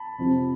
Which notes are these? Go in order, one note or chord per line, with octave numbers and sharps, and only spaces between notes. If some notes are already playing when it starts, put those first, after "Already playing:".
Already playing: A5 B5
F2 C3 F3